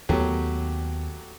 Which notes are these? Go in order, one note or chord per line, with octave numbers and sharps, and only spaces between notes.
D#2 F#3 A3 B3 G4